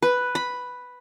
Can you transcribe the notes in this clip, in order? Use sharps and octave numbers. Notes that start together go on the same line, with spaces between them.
B4
B5